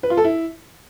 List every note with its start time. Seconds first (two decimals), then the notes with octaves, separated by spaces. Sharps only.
0.03 B4
0.10 F4
0.17 A4
0.24 E4